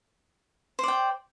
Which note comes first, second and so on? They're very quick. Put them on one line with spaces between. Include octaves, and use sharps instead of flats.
C5 D5 G5